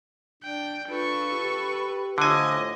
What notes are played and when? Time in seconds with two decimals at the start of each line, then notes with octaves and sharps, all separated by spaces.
0.43 D4 G5
0.89 D4 F4 A4 B4 C#6
1.33 G4
2.18 A2 D3 F4 C5 D#5 G#5